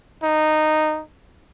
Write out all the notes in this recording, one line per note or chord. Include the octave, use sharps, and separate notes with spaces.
D#4